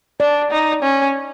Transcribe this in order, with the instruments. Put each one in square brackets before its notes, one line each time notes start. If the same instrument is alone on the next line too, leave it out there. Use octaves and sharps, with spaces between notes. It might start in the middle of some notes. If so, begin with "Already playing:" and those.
[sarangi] D4 [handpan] D5
[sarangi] D#4
C#4